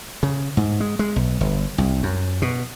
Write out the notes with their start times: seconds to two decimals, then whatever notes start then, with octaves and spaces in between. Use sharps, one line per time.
0.23 C#3
0.57 G#2
0.80 G#3
0.99 G#3
1.16 B1
1.41 G1
1.78 C2
2.03 F#2
2.42 B2